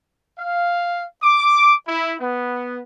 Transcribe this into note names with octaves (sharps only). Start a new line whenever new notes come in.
F5
D6
E4
B3